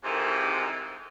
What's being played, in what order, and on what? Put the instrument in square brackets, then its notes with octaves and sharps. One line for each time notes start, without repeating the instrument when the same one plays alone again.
[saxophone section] F2 G#2 C3 D#3 E3